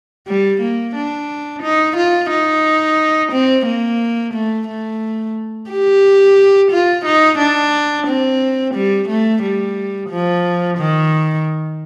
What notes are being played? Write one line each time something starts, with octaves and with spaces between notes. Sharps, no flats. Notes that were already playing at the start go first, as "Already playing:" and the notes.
G3
A#3
D4
D#4
F4
D#4
C4
A#3
A3
A3
G4
F4
D#4
D4
C4
G3
A3
G3
F3
D#3